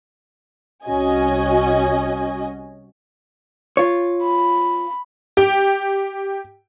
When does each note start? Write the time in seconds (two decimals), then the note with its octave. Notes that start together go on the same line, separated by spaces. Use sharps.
0.85 C2 C#4 F#4 D#5 G#5
3.77 F4 C#5
4.22 B5
5.37 G4 G5